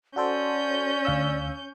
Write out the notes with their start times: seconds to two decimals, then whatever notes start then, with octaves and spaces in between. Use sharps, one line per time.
0.16 C#4 F#4 A4 C5 D5 G6
1.05 D2 F5 E6